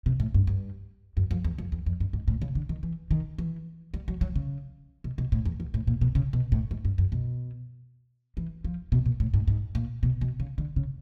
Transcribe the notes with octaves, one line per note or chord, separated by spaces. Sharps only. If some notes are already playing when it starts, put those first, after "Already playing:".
C3
A2
G2
G2
F#2
F2
E2
F2
E2
F2
G2
G#2
A2
C#3
D3
D#3
E3
D#3
E3
G3
F#3
F#3
C#3
B2
B2
A2
E2
E2
A2
A#2
B2
C#3
B2
A2
G#2
G2
F#2
B2
E3
F3
B2
A#2
A2
G#2
G#2
A#2
B2
B2
C#3
D3
C#3